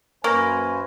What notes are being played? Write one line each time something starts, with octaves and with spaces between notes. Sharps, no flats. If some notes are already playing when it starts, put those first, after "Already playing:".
F#2 A#3 B4 C5 G#5 C#6 F6 A#6